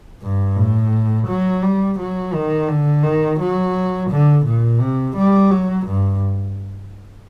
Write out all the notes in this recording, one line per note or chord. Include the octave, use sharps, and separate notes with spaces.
G2
A2
F#3
G3
F#3
D#3
D3
D#3
F#3
D3
A#2
C3
G3
F#3
G2